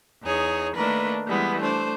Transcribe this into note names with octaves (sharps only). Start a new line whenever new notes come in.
E2 D#4 G#4 C#5
D#3 A3 A#3 D4 A#4 B4
E3 G3 G#3 B3
A3 D4 C5